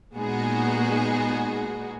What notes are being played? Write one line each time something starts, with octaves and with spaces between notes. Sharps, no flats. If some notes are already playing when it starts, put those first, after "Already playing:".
A#2 G#3 B3 D#4 F#4 G#4